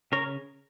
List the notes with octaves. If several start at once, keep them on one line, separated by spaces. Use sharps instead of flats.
C#3 A#4 C#5